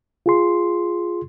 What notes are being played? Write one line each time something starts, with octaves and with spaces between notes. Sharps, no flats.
F4 G#4 C6